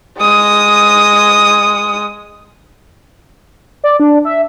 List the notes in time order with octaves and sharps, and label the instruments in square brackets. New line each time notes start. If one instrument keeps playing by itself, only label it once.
[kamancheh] G#3 D#6
[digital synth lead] D5
D4
E5